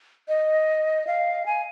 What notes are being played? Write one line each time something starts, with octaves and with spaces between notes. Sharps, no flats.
D#5
F5
G#5